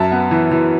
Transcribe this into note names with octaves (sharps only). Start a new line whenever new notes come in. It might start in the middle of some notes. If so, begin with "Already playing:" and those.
Already playing: F#2 E5 A5
B3
E3
E3